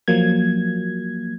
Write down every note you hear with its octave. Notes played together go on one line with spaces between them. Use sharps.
F3 F#3 A#3 G#6